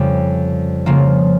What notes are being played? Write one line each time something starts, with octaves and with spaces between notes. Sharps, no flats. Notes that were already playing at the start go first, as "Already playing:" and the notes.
Already playing: F2 C#3 G3
C#3 F3 A#3 F4